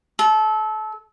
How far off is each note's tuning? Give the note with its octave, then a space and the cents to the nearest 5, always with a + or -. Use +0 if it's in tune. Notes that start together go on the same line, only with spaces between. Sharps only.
A4 -25